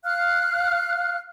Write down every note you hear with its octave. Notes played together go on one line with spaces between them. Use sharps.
F5 F6 F#6